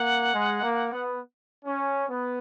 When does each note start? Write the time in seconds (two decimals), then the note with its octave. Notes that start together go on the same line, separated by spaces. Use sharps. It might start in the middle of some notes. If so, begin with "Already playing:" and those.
Already playing: A#3 F#5
0.34 G#3
0.62 A#3
0.92 B3
1.65 C#4
2.09 B3